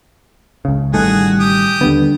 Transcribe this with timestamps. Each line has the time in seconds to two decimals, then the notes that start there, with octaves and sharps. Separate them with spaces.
0.65 C#2 C#3
0.94 A1 D#3 G3 A3 F#4 G#4
1.40 G4 D#6
1.81 D#2 D3 G3 B3